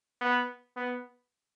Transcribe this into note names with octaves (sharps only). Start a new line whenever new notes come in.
B3
B3